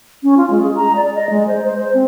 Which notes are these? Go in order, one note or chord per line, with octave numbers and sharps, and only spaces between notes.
C#4
F4
G#3
G#4
A#5
D5
D#5
G#3
C5
C5
C5
C4